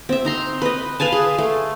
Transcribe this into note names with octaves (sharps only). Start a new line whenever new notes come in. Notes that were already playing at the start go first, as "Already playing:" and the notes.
C4 E5
D#4 A#5 C6
B4 D#5
B4 F5 G#5 A5
G#4 C6
A3